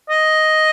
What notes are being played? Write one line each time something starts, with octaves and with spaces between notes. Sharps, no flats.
D#5